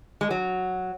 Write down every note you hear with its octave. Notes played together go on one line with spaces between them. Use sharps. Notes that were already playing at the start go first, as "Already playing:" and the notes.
G#3
F#3